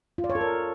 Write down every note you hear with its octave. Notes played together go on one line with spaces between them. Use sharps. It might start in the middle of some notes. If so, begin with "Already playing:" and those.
F4
D5
C#5
A4
A#4